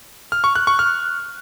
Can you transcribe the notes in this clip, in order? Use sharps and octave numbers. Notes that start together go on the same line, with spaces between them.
F6
C#6
F#6
C#6
F6